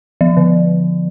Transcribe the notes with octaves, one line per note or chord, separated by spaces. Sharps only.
F3
D3